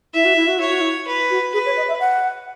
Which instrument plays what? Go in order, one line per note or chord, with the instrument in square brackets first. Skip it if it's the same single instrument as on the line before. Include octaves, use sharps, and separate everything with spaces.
[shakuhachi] E4 [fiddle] E5
[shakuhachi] F#4
E4
F#4
[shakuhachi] E4 [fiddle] C#5
[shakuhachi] F#4
E4
[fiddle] B4
[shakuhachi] F#4
[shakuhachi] G#4 [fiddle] B4
[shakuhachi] C#5
D#5
E5
F#5